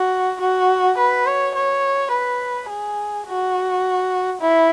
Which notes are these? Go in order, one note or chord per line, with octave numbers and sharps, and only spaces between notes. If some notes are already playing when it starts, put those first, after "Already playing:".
Already playing: F#4
F#4
B4
C#5
C#5
B4
G#4
F#4
E4